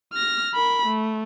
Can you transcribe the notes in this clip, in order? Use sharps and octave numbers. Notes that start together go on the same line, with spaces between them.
F6 A#6
A#4 B5
A3